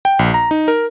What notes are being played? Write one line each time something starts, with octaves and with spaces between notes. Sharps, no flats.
G5
A#1
A#5
D#4
A#4